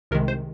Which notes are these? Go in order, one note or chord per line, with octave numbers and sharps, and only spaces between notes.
C2 C3 D#3 G#3 A#4
C5